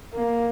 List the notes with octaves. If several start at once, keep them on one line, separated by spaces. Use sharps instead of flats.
A#3